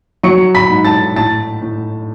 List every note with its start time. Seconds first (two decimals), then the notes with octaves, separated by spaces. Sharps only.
0.23 F#3 C#6 C#7
0.55 B5 B6
0.70 G#2
0.85 A5 A6
1.16 A2 A5 A6
1.62 A2